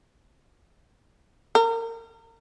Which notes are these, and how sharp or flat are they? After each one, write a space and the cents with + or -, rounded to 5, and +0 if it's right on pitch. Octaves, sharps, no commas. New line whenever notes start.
A#4 -30